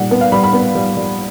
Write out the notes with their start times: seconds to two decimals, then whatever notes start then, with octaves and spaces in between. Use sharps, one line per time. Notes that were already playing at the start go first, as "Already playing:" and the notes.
Already playing: A#2 G3 F#5
0.11 B3
0.21 F5
0.32 G3 B5
0.43 B5
0.53 B3
0.75 G3
0.97 G3